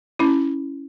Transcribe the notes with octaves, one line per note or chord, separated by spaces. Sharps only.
C#4 E4